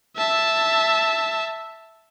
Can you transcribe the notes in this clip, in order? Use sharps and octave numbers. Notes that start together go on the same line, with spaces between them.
E5 A5